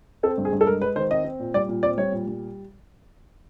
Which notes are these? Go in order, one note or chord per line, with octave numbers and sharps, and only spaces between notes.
C4 A4
G2
G#4
G2
A4
G#3 A#4
G#3 B4
D#3 C5
C4 D#5
C4
A#2
G3 D5
A#2
C4 D5
G3 C#5
A#2
G3